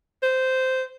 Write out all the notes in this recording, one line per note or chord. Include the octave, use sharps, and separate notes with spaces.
C5